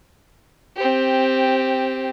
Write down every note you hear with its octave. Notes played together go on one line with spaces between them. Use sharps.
C4 G4